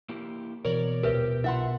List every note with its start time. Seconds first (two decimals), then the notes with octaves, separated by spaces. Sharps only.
0.09 A#3 E4 G4
0.65 B2 E3 A#4 C#5 D5
1.03 D#1 C#2 G4 A#4 B4 E5
1.44 B1 E4 F4 E5 F#5 B5 C6